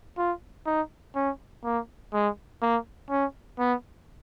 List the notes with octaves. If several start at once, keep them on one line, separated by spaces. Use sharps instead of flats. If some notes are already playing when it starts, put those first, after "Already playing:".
F4
D#4
C#4
A#3
G#3
A#3
C#4
B3